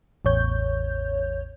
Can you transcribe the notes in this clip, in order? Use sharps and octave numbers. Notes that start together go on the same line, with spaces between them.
A1 E2 C#5 G6